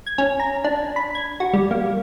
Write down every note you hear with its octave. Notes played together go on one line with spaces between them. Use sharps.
G#6
C#4
A#5
D4
B5
G#6
F#4
G3
A#3